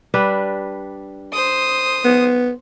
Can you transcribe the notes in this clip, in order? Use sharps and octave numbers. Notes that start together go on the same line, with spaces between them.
G3 D4 B4
C5 D#6
B3